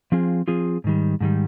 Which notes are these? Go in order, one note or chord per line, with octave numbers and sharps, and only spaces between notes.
F3 C4 F4 G#4
F3 C4 F4 G#4
G#2 D#3 G3
G#2 D#3 G3